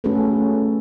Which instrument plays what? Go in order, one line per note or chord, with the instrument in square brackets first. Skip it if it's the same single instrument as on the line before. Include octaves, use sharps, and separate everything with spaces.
[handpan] A3 C#4 F#4 G#4 A4 B4